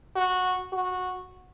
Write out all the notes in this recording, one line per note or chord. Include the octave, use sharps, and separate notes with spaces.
F#4
F#4